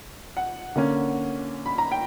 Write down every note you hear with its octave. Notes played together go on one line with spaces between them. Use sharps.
F#5
D3 A#3 C#4
B5
A#5
G5